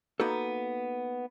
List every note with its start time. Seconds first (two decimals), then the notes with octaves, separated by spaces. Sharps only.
0.20 A#3 B3 D#4 F#4 A4